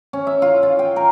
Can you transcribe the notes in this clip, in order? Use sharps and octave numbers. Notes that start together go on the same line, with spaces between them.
C#4
E5
F4
F4
G5
A#4